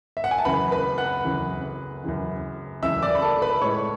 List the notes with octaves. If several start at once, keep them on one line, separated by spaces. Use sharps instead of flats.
E5
F#5
G#5
A5
F#2 C#3 E3 B4 B5
B4 B5
F#5 F#6
F#2 C#3 E3
F#2 C#3 E3
F#2 C#3 E3 E5 E6
D5 D6
B5
A4 A5
B4 B5
A2 G#3 C#5 C#6